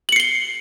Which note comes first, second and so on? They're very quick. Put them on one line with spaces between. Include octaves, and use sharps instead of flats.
F#7 C#7 C7 G7